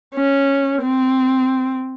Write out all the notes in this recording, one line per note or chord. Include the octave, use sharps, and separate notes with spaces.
C#4
C4